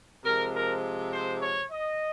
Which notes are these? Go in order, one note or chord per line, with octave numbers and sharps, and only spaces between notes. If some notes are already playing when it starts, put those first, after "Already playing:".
C3 F3 G#3 A#4
A#4
C5
C#5
D#5